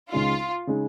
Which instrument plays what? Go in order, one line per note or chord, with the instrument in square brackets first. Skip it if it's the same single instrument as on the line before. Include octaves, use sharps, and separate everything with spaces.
[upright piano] C#2 C#3 G#3 D#4 [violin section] F4
[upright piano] C#3 G#3 D#4